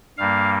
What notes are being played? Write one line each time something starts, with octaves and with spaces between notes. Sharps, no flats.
G2 G3 A#3 F5